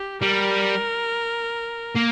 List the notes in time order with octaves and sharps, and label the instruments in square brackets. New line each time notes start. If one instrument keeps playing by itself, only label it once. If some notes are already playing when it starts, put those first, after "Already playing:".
Already playing: [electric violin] G4
[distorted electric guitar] G3 [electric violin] A#4
[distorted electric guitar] A#3